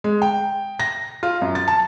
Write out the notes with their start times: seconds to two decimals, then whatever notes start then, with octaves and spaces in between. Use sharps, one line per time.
0.04 G#3
0.22 G5
0.80 A#6
1.23 F4
1.42 F#2
1.55 A6
1.68 A5